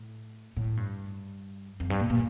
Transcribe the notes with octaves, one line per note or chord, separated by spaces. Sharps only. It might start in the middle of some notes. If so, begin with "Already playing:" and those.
Already playing: A2
A2
G2
F2
G2
A#2
A#2